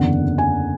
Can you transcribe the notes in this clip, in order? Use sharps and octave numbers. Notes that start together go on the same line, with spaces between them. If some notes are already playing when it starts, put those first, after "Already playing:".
Already playing: F#1 E2 D3 F#5
G#5